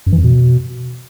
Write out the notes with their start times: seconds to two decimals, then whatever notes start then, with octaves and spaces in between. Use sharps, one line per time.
0.06 F#2
0.12 E3
0.18 F2
0.24 B2